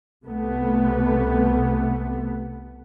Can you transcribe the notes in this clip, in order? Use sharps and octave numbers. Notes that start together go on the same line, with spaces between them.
C2 C3 A3 B3